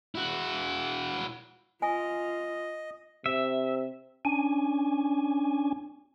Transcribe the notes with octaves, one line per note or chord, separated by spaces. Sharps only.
E4 F#4
F4 D#5 G#5
C3 E5
C#4 D4 G#5